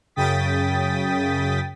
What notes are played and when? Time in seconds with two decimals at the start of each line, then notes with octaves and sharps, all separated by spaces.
0.16 F#2 C#3 G5 D#6 A6 B6